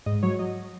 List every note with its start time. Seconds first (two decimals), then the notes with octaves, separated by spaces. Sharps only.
0.06 G#2 D#5
0.23 F#3 C#5
0.39 F#3 D#5